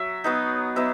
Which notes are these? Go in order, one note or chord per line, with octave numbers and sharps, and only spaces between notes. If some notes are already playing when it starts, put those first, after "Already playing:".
Already playing: F#3 E5
F#3 B3 D#4
F#3 B3 D#4 E5